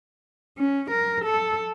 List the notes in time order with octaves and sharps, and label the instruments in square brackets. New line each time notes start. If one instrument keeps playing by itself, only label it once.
[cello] C#4
A#4
A4